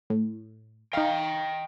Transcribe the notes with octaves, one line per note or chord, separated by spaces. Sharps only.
A2
D#4 D#5 F5 G5